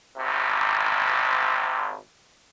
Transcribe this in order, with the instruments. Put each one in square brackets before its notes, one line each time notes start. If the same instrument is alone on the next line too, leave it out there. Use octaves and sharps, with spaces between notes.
[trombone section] G#1 C3